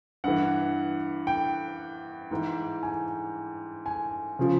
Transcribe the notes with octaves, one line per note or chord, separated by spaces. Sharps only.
G2 E3 F#5
G5
G#2 E3
G#5
G#5
C#3 F3